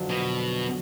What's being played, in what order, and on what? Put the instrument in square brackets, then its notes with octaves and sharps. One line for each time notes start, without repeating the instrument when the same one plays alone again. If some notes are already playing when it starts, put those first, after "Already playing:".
Already playing: [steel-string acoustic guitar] F2 D3 F#3
[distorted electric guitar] B2